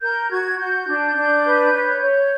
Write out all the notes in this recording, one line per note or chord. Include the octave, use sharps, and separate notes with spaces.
A#4 G6
F#4 G#6
F#4 G6
D4
D4
B4
C#5
C#5